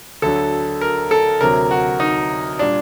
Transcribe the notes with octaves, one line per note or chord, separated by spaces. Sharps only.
D2 D3 F#3 A4
A#4
A4
D2 C3 F#3 A#4
F#4
D#4
A#2 G3 D4